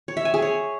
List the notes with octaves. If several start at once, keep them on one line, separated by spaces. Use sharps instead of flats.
C#5
E5
G#5
G#4
C#5